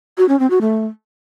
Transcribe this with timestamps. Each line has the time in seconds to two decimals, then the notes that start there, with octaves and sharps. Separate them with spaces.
0.18 F#4
0.29 C#4
0.40 C4
0.50 F#4
0.61 A3